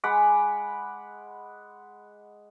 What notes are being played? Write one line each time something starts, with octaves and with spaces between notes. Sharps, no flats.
G#3 F#5 B5 D6